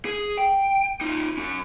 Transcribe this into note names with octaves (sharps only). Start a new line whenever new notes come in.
G#4
G5
D#4 F4
C#4 F#4